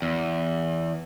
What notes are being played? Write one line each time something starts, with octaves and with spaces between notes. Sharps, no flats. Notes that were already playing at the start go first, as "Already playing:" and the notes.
E2